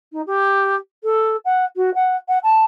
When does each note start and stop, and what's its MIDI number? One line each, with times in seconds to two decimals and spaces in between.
0.12 0.21 63
0.27 0.75 67
1.04 1.37 69
1.45 1.65 78
1.76 1.94 66
1.94 2.16 78
2.28 2.39 78
2.43 2.65 81